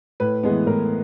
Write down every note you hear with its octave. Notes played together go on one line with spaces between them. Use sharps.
A2 B4
E3 G#3 B3
A2 A#4